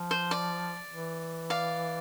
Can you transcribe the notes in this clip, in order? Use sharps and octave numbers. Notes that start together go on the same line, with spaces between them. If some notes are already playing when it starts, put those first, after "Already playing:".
Already playing: F3
C5
D5
E3
D5 F5